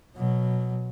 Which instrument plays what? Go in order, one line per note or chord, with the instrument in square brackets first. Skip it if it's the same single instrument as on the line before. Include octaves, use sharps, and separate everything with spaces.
[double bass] B2 F#3